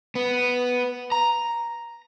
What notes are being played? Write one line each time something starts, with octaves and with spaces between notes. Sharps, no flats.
B3
A#5